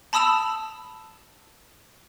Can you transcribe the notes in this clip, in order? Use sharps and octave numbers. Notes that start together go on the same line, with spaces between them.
A5 B5 D#6 E6 E7 F7